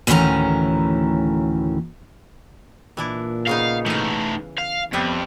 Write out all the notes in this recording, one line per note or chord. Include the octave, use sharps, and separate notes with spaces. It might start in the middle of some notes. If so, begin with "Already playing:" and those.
D2 A2 D#3 E3 C#4 A#5
A#2 E3 D4 E4
C#3 B3 D#4 F5
E3 A3 D#4 F5
F5
F2 G3 B3 B4 E5